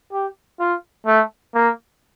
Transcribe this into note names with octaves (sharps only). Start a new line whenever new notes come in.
G4
F4
A3
A#3